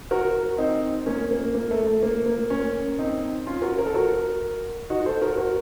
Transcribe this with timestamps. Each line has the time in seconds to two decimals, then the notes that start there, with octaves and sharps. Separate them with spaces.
0.11 F#4 A#4
0.58 C4 D#4
1.06 A#3 C#4
1.31 A#3
1.55 A#3
1.71 A3
1.87 A3
2.03 A#3
2.26 A#3
2.50 A#3 C#4
2.99 C4 D#4
3.46 C#4 F4
3.62 F#4 A#4
3.78 A#4
3.86 A4
3.94 F#4 A#4
4.90 D#4 F#4
5.06 A4 C5
5.22 F#4 A#4
5.37 F#4 A#4